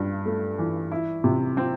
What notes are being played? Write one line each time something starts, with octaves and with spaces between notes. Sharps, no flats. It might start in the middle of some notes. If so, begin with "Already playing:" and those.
Already playing: G2
A3
E3
E4
C3
C4